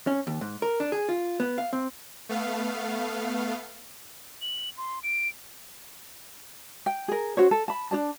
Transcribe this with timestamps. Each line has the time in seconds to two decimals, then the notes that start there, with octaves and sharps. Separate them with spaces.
0.07 C#4
0.27 D#2
0.41 G#2
0.62 A#4
0.80 D4
0.92 G#4
1.09 F4
1.40 B3
1.58 F5
1.73 C4
2.29 A3 B3 F5
4.42 F#7
4.77 C6
5.03 D7
6.86 G5
7.08 G#4 A#4
7.37 C#4 F#4 C5 C#5
7.51 A4
7.68 A5 B5
7.91 D4 G#4 D5 A5